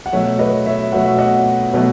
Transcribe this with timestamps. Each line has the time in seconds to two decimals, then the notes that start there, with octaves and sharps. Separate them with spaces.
0.06 F#5
0.12 B2 F#3 A3 C#5 E5
0.39 B4 D#5
0.66 C#5 E5
0.92 B2 F#3 A3 F#5
1.06 E5
1.18 D#5 F#5
1.73 B2 F#3 A3